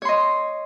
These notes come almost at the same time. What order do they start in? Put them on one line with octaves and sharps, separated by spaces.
C#5 C6 D#5